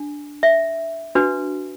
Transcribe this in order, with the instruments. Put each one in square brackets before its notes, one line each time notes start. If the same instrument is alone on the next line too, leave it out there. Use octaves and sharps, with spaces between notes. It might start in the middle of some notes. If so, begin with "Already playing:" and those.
Already playing: [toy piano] D4
E5
D4 F#4 B4